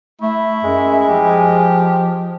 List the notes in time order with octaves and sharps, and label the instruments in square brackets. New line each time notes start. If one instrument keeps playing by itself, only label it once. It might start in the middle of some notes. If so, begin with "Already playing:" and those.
[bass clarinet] A3 [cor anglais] E4
[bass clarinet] F#2 [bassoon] G#3
[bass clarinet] F3 [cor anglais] G4